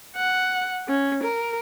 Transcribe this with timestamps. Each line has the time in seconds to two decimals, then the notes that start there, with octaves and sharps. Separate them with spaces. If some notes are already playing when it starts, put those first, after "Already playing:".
0.16 F#5
0.88 C#4
1.24 A#4